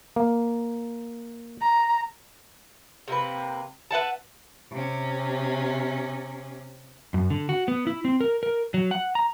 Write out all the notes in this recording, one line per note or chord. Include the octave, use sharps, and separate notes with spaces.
A#3
A#5
C3 A#3 C4 B4
B4 E5 F#5 A5
C3 C#4
F#2
D3
F#4
B3
E4
C4
A#4
A#4
F#3
F#5
A#5